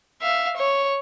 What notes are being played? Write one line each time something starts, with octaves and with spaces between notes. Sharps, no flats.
E5 F5
C#5